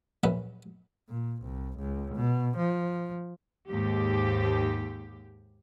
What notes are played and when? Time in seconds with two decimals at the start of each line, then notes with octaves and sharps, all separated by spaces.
0.24 A#1 F#2 A#2 C#4 B4 E5
1.09 A#2
1.43 C2
1.79 C#2
2.15 B2
2.58 F3
3.68 D#2 G#2 G4